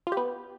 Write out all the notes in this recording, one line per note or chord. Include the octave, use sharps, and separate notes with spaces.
F4
G4
B3